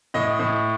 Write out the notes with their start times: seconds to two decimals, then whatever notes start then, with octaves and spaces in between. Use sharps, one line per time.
0.14 A2 D#5
0.39 A2